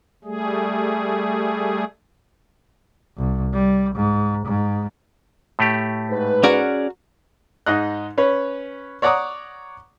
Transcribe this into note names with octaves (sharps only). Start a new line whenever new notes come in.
G3 A3 G#4
C2
G3
G#2
G#2
A2 A3 G4
G#2 B4
C#4 F#4 G#4 A#4 D5 F#5
G#2 D#4 D#5 F#6
C#4 B4 C#5
C#5 D5 F#5 A#5 D6 D#6